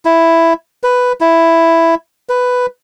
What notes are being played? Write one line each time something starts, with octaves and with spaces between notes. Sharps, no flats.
E4
B4
E4
B4